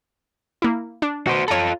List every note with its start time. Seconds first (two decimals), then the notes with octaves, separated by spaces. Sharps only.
0.62 A#3 E4
1.02 D4
1.27 B2 F#4 C5
1.48 F4 A4 C#5 A#5